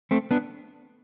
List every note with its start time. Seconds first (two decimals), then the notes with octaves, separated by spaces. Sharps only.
0.11 A3 C4
0.31 B3 D4